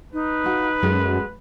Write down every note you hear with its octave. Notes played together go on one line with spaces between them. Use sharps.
D#4 B4
F4 F#4
F#2 G#3 F#4 A4